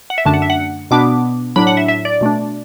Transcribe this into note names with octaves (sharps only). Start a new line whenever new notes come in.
F#5
E5
F#2 D3 A3 D4 A5
F#5
E5
F#5
B2 B3 D4 D6
A2 F#3 D4 B5
F#5
E5
E5
D5
B2 A3 D4